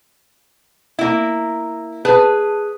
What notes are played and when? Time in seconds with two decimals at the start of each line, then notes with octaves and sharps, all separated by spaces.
0.99 A#3 E4
2.05 G#4 B4 A5